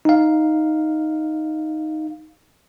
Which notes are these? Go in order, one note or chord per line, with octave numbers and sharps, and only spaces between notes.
D#4 F5